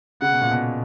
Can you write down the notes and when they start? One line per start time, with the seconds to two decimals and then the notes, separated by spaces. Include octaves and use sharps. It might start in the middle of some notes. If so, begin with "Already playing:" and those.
0.22 C#3 F#5
0.32 B2
0.41 A#2
0.51 B2